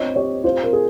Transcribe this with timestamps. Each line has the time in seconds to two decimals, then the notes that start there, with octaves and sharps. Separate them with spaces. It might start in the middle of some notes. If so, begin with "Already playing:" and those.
Already playing: C4 F4 C#5 D#5
0.16 G4 C#5
0.44 F4 C5
0.63 A#4
0.73 G#4